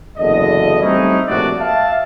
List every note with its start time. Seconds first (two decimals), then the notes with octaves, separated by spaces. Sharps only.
0.17 F#1 E2 D3 D#5
0.81 G3 A3 C4 C#4 D#4 E4
1.27 A#1 A2 C3 D4 F#4 D5
1.59 E5 F5 A5